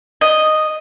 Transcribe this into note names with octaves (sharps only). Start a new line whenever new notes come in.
D#5